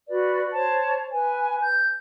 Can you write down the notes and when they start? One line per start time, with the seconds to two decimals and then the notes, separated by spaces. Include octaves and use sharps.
0.09 F#4 B4 D5
0.53 C5 C#5 A5
1.11 B4 G#5
1.60 G6